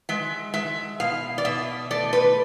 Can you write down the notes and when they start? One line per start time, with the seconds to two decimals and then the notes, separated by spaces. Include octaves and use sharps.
0.09 G#3 E5
0.54 G#3 E5
1.00 B2 F5
1.38 D5
1.45 B2 E5
1.91 A3 D5
2.13 B4